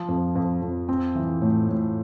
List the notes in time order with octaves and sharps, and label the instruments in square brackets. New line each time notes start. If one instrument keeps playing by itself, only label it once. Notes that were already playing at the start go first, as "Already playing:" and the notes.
Already playing: [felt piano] F3
F2
F2
F2
C4
E3
A2
A2